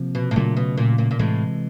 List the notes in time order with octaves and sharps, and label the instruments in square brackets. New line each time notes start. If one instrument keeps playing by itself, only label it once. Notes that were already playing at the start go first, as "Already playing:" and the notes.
Already playing: [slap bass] C3 F3 A#3
[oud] B2
A2
[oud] A#2 [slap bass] C#3 F#3 A3
[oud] B2
A#2
A#2
A#2
[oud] A2 [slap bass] C3 E3 G#3